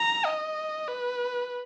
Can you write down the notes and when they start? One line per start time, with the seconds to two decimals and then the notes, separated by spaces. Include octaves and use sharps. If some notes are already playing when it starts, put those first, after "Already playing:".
Already playing: A#5
0.25 D#5
0.88 B4